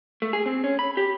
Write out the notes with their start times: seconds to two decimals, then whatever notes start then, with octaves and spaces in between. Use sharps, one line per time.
0.22 A3
0.33 G#4
0.46 C4
0.64 C#4
0.79 B5
0.97 G4